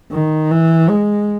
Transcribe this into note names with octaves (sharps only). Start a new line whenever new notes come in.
D#3
E3
G#3